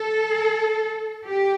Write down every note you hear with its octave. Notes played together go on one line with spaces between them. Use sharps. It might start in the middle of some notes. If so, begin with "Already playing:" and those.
Already playing: A4
G4